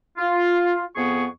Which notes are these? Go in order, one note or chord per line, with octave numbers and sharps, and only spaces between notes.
F4
F2 B3 G#4 C#6